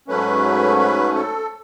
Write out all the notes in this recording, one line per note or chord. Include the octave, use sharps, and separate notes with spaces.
G#2 F#3 A3 C#4 B4
B4
A4